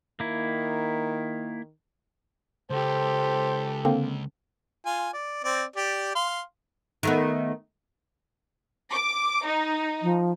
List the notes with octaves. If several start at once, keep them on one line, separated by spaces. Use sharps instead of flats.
D#3 A#3 E4
C#2 G4 A4 C5
D3 A#3 C4
F4 G#5
D5
C4 D5
G4 D5
F5 C6
D#3 A3 B3
D6
D#4
F3